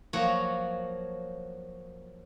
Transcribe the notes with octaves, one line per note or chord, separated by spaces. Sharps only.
F3 F#3 A#3 F#4 C#5